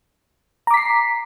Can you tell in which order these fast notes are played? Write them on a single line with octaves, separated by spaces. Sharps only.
A#5 D6 B6 C7